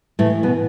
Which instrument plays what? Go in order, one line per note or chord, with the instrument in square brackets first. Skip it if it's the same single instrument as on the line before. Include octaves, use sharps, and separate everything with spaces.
[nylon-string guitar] A2 A3 [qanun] E3
[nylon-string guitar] B2 B3